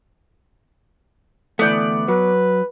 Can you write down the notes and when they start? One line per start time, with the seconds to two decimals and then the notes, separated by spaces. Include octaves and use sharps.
1.59 D2 E3 A3 B3 D5 G6
2.08 F#3 B4